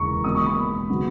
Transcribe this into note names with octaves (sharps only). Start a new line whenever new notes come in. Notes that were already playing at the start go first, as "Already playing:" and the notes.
Already playing: E1 D#2 C#3 E3 A#5 C#6
C#2 B2 A#3 D#6
C#6
B5
C#3 F#3 B3